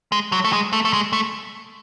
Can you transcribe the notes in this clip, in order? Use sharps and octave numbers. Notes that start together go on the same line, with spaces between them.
G#3
F#3
A3
G#3
A3
A3
G#3
A3